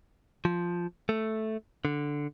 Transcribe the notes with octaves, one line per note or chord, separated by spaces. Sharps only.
F3
A3
D3